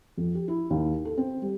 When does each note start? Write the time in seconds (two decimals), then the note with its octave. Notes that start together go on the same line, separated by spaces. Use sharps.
0.17 F2
0.35 G4
0.48 E4
0.70 D#2
1.05 A4
1.18 C4
1.42 G3